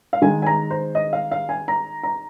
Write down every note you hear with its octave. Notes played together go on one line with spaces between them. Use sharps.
F5
D#3 G#3 G#5
G#5
A#5
C5
D#5
F5
F5
G#5
A#5
A#5